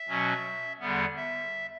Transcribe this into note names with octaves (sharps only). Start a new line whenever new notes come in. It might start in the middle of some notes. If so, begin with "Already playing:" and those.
Already playing: E5
B2 F#3 C#4
E2 D3 G3 B3
E5